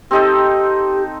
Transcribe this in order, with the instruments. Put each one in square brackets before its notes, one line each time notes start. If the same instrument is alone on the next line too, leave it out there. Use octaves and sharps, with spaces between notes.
[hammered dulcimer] C4 D#4 A4 [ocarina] G4